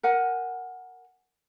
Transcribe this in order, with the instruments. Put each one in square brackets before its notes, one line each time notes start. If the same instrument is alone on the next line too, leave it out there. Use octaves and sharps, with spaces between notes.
[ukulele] A#4 F#5 G#5